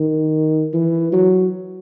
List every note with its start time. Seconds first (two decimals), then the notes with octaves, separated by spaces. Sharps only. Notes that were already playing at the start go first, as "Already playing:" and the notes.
Already playing: D#3
0.74 E3
1.12 F#3